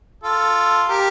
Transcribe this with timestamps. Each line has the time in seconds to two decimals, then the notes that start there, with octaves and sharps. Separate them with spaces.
0.24 F4 A4
0.89 G4 A#4